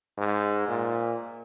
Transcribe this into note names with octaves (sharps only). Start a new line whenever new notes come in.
G#2
A#2